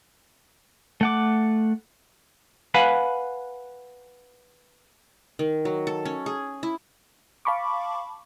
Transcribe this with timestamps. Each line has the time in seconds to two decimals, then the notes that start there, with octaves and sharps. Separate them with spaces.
1.01 A3 F#5 D6
2.74 B4 F5 F#5 G#5 B5
5.39 D#3
5.65 F#3
5.87 A4
6.05 C#4
6.26 G#4
6.63 E4
7.45 F5 A5 B5 C#6 D6